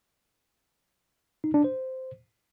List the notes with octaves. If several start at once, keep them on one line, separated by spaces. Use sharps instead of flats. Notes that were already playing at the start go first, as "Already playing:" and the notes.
D#4
D4
C5